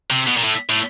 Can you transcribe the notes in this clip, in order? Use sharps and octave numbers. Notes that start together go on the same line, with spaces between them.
C3
B2
A#2
A2
A2